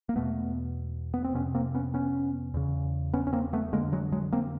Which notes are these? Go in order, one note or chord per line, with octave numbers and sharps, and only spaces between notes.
A#3
E2 B2 A3 B3
B3
C4
F2 C3 B3 C#4
A#3 C4
B3 C#4
B3 C#4
E2 C#3
B3 C#4
C#4
A#3 C4
A3 B3
F2 D3 G#3 A#3
F#3 G#3
F#3 G#3
A#3 C4